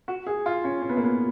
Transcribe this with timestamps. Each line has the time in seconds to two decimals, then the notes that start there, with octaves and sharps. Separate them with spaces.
0.08 F#4
0.26 G#4
0.46 F4
0.64 C#4
0.82 C#4
0.89 B3
0.97 A#3
1.04 B3